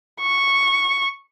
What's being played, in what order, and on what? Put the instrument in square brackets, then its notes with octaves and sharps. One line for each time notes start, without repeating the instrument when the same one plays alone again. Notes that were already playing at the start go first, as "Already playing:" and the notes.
[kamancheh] C#6